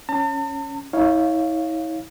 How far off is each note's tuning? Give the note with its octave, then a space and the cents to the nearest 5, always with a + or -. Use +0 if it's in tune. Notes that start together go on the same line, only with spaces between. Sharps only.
C#4 +0 A5 +45
E4 -45 C#5 +0 F5 +0